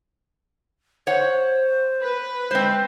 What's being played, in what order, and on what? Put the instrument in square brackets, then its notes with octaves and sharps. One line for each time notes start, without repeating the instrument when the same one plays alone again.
[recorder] C5 [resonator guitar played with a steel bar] C#5 F#5
[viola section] B4
[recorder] G#3 [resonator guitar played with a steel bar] C4 C5